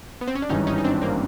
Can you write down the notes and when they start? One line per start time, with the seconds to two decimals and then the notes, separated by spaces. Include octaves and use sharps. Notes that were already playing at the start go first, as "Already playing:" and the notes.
0.21 B3
0.27 C4
0.35 C#4
0.42 D4
0.49 G#1 G2 E3 C#4 D#4
0.67 C#4 D#4
0.78 D#4
0.84 C4 D4
1.02 A#3 C4